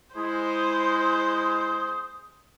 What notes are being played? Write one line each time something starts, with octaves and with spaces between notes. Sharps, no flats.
G#3 E4 C5 D#6